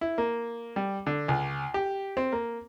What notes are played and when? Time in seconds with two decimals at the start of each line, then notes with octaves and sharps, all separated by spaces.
0.01 E4
0.18 A#3
0.76 G3
1.07 D3
1.28 C#2
1.74 G4
2.17 C4
2.33 A#3